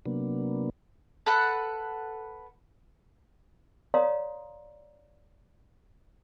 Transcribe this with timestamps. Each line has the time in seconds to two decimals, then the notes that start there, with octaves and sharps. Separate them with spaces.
0.06 C3 F#3 A#3 B3 D4
1.26 A4 B4 F#5
3.94 C#5 D5 F5 A#5 C6 D#6